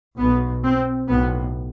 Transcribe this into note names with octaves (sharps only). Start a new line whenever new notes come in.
B1 B2 B3
C4
B1 A2 B3